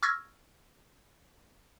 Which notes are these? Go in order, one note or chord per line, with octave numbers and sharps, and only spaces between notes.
C#6 E6 F6 G#6 A#6